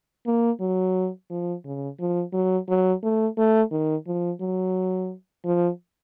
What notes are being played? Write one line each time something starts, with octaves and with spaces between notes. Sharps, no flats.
A#3
F#3
F3
C#3
F3
F#3
F#3
A3
A3
D#3
F3
F#3
F3